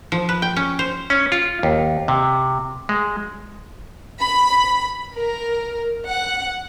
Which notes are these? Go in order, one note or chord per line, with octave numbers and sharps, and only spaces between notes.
F3
B4
G5
C#4
C5
C#4
F4
D#2
C3
G#3
B5
A#4
F#5